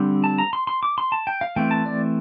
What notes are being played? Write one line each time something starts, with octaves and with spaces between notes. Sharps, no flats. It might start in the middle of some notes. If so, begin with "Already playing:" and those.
Already playing: D3 G3 C4
A5
A#5
C6
C6
D6
C6
A5
G5
F5
E3 A3 C4 G5
A5
D5